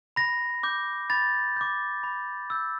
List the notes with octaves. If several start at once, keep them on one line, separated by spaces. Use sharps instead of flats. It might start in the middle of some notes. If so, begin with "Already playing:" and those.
B5 A#6
D6 G6
B5 A6
D6 G6
B5
E6 G6